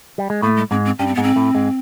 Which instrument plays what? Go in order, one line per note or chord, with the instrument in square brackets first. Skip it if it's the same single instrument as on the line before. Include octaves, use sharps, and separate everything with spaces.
[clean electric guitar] G3
G#3
[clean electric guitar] A2 A3 [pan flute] A#3
[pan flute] G#3
[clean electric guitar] G#2 G#3 [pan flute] C4
[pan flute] C4
[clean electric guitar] G2 G3 [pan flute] C#4
[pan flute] C4
[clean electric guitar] G#2 G#3 [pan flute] B3
[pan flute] C4
[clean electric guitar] A2 A3
G#2 G#3